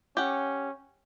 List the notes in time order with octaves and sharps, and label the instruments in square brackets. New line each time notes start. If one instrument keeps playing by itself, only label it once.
[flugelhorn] C#4 [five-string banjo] G4 F#5